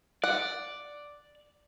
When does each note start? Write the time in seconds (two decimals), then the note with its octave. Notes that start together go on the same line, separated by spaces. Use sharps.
0.24 D5 F#5